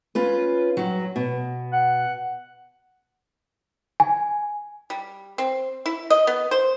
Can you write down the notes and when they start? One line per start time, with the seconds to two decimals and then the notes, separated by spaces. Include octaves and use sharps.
0.15 C#4 F4 B4
0.77 G2 F#3
1.16 B2
1.73 F#5
4.00 G#5
4.90 G3
5.38 C4
5.86 E4
6.10 D#5
6.27 B3
6.51 C5